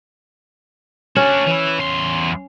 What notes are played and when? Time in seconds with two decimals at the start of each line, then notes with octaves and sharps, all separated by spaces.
1.16 C#4 D4 F#4
1.47 E3 E4
1.79 E2 C6